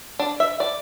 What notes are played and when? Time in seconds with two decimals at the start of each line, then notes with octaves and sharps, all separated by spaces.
0.19 D4
0.40 E5
0.60 D5